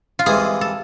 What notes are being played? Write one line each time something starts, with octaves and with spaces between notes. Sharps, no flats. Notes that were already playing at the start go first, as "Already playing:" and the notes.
F4
C2 C3 E3 G#3 B3 G#4
A4